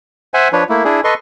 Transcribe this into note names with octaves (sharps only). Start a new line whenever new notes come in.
C5 E5 F#5 G#5
F3 D4 B4 C#5
A3 A#3 E4
D4 E4 G#4
A4 B4 D#5 C6 C#6